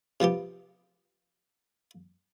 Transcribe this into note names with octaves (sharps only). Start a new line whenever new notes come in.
C3 F3 B3 G4